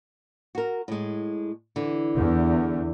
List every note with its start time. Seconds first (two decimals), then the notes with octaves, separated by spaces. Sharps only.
0.55 F#4 A#4
0.88 A2 G#3
1.76 D3 E3
2.17 E2